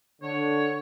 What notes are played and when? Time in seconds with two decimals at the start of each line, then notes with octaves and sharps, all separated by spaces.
0.22 D3 C#5